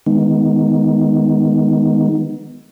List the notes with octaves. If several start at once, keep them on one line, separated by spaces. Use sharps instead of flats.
D#3 G#3 B3 D#4